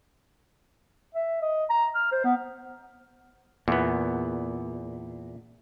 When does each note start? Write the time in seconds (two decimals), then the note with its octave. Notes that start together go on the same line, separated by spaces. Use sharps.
1.15 E5
1.41 D#5
1.70 A#5
1.95 F6
2.12 C5
2.24 B3
3.68 E2 A#2 B3